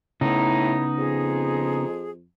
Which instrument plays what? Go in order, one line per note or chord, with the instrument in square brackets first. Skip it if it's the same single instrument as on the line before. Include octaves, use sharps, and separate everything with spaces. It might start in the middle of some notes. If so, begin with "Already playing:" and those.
[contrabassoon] A2 [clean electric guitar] C#3 B3 [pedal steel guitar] D#4 [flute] E4
[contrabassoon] F2 [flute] G#4